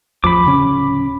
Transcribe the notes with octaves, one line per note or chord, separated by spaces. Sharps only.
A1 E2 F3 B5 D6
D1 C#3 C#4